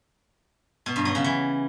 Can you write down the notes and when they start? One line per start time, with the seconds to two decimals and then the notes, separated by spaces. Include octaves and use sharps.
0.86 B2
0.96 G2
1.05 F#3
1.15 C#3
1.24 E3